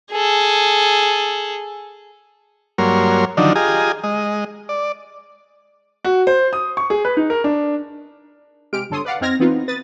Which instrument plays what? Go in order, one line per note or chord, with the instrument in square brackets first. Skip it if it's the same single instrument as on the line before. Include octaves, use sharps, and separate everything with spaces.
[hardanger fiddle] G#4 A4
[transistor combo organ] G2 F#3 A#3 A#4 C#5 C6
D3 D#3 F3 F#3 D4 D#4
F4 G4 G#4 D#5 G#5 A#5
G#3 D#5
D5
[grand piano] F#4
C5
D#6
C#6
G#4
B4
D#4
A#4
D4
[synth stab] C3 G#3 G4 F6 D7
G1 D3 A4 C#5 C6 D#6
B4 D5 F5 F#5
F2 C4 D#4 F6 G#6 A#6
E3 B3 C4 D#4 F4
B4 D#6 A6